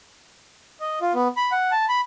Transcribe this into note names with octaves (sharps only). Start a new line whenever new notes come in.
D#5
F4
B3
B5
F#5
A5
B5